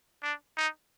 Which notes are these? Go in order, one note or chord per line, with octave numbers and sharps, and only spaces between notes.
D4
D#4